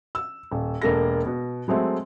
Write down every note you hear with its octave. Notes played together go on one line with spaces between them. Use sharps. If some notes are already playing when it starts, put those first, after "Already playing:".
E6
D#1
E1 A#3 A4 A#6
B2
F#3 G#3 A3 C4